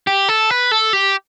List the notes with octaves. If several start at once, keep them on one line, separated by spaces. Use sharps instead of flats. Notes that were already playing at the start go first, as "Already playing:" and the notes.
G4
A4
B4
A4
G4